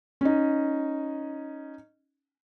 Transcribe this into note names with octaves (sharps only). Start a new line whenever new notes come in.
C#4 D#4